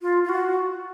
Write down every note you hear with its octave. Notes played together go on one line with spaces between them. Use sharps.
F4
F4
F#4